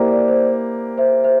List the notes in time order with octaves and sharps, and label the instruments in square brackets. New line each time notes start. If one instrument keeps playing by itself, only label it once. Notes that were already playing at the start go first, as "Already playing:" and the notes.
Already playing: [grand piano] A#3 E4 G4 [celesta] C5 D5
[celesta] D5
C5
C5 E5
C5 E5